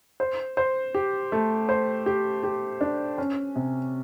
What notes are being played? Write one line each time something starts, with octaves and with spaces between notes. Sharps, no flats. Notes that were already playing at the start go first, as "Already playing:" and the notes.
C5
C5
G4
A3
C5
G4
G4
D4
C#4
C3